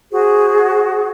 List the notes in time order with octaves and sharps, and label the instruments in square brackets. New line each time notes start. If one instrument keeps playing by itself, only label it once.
[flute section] F#4 G#4 C5